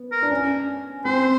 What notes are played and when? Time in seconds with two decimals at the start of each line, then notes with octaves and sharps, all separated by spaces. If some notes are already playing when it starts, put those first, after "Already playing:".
Already playing: B3
0.12 A#4
0.23 D4
0.31 C#4
1.05 C4 C5